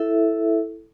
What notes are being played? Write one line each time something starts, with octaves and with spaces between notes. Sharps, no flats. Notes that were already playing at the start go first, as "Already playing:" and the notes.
Already playing: E4 A4 E5